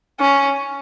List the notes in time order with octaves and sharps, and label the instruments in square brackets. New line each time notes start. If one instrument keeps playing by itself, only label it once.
[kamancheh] C#4